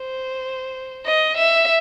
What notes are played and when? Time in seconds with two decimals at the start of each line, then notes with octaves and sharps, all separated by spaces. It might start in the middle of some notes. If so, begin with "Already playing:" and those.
Already playing: C5
1.06 D#5
1.37 E5